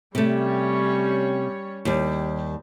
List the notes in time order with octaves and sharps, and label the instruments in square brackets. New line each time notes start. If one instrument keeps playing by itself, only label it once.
[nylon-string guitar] C3 A3 [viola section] G3 C#4 C#5
[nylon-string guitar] D#2 G3